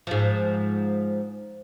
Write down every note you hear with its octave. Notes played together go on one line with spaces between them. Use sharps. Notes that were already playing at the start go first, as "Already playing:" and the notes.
G#2 F3